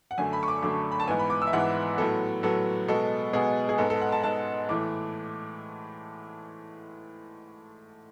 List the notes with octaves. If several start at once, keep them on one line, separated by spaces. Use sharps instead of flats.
F#5
F#2 D3 A3 G#5
B5
C#6
D6
F#2 D3 A3 D6
B5
A5
G#2 E3 B3 G#5
B5
D6
E6
E5
G#2 E3 B3 F#5
A2 F#3 B3 A4
A2 F#3 B3 A4
B2 G#3 B3 A4
B2 G#3 B3 G#4
G#4
G#2 G#3 B3 A4
A4
F#5
A5
G#2 G#3 B3 A5
A2 E3 A3 D6